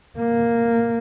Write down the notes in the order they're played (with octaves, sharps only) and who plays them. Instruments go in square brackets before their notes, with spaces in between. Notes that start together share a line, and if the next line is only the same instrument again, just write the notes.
[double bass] A#3